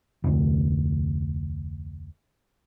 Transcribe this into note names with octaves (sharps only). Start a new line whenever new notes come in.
F1 D2